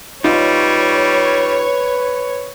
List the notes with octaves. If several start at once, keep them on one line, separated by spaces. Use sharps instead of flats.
G3 D#4 F4 B4 C#5